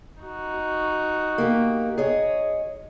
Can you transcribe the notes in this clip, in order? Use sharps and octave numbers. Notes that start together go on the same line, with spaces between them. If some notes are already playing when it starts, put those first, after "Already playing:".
D#4 F#4
A#3 G4
G#4 C#5 D#5